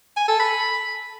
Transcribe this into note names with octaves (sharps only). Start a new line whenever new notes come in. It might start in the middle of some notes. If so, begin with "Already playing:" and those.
G#5
A4
B5